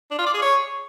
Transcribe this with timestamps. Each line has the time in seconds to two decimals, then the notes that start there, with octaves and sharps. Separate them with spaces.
0.11 D4
0.18 F4
0.26 D5
0.34 G#4
0.42 C#5